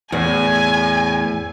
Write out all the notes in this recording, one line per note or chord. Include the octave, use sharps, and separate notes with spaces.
E2 A2 G#5